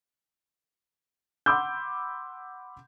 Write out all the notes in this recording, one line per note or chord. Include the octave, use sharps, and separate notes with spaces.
F#5 B5 C6 D6 E6 G6